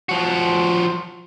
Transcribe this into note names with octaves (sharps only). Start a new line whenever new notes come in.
F3 F#4